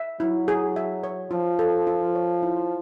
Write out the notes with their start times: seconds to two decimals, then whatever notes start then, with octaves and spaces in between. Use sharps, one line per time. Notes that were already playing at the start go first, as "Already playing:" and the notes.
Already playing: E5
0.20 F#3 E4
0.48 G#4
0.76 E5
1.04 C#5
1.31 F3 F4
1.59 A4
1.87 F4
2.15 C#5
2.43 E4